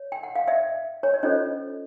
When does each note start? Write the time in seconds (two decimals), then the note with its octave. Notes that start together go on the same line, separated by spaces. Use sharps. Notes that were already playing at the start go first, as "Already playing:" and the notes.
Already playing: C#5
0.12 G5
0.23 F#5
0.36 F5
0.48 D5 E5
1.03 C#5
1.14 D5
1.23 C#4 F4 A4 C5 C#5 D#5